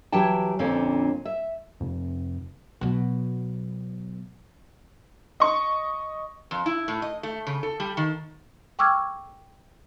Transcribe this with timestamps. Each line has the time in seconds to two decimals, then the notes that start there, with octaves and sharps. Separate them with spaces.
0.12 E3 F#3 G4 G5 A5
0.59 F2 A#2 D3 C4 C#4
1.25 E5
1.80 F2 C3 B3 C4
2.81 B2 F#3
5.40 D#5 C#6
6.51 F2
6.66 E4
6.88 A2
7.02 D#5
7.23 A3
7.47 C#3
7.63 A4
7.80 G3
7.97 D#3
8.79 G5 C#6 D6 E6 F6 G#6